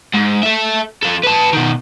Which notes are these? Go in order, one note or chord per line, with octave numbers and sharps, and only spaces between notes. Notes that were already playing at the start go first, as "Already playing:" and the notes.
G#2
A4 E5
F3 A4
B4 A5
B2 D#3